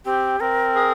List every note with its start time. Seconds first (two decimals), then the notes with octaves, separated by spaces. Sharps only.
0.05 C4 G4
0.40 C4 A#4
0.75 G#4